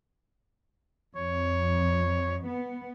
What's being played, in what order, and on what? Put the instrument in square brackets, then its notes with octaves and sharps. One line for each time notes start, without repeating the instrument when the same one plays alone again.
[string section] F2 [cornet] C#5
[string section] B3